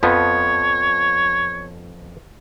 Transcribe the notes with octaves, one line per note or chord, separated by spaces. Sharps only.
F2 F3 B3 C#5